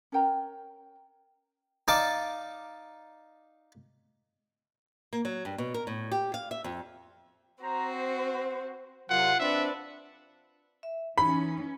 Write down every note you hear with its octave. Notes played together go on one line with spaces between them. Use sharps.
C#4 A#4 G5 A#5
D#4 D5 F5 A5 D6
A#3
F#3
G2
B2
A#4
A2
G4
F5
E5
F2
C4 F#4 C5 A#5
C5
F#2 C3 F#3 F4 F#5
C4 D4 B4 D5 E5
E5
E3 C#4 D#4 B5